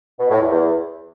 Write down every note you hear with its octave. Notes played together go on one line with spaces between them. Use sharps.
B2
A2
E2
E2